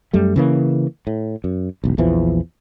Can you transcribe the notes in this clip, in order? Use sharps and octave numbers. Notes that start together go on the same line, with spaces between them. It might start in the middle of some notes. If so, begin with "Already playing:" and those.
F#2 G3 A3
C#3 E3 A#3
A2
F#2
E1 B1
A#1 E2 E3 F3